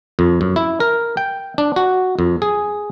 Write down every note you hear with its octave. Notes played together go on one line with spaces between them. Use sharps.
F2
F#2
E4
A#4
G5
D4
F#4
F2
G#4